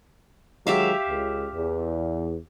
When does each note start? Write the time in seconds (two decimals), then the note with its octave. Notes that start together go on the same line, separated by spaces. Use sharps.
0.67 D#3 F#3 G#3 G4 E5 F5
1.07 C#2
1.54 E2